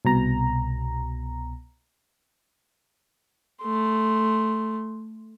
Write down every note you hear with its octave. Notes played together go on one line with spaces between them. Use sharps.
C2 B2 A#5
A3 C6